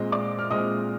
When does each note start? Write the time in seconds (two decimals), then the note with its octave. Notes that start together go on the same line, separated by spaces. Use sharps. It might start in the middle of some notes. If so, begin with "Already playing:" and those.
Already playing: A#2 G#3 C4 D#5
0.12 D5 D6
0.39 F6
0.50 A#2 G#3 C4 D#5 D#6